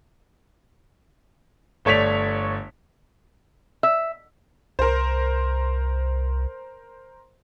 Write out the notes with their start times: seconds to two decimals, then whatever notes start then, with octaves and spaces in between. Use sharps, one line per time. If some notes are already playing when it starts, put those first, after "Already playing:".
1.85 G1 A3 C#5 D5 B6 F7
3.83 E5
4.79 C2 A#4 C5